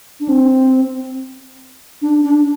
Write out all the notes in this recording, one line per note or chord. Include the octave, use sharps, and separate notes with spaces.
D4
C4
D4
D4